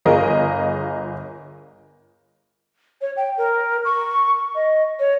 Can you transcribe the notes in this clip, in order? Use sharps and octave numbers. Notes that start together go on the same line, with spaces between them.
G1 F4 G#4 A#4 D#5
C#5
G5
A#4
C#6
D#5
C#5